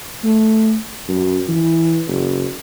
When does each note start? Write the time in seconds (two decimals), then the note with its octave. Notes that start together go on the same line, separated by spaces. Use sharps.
0.24 A3
1.08 F#2
1.49 E3
2.08 F#1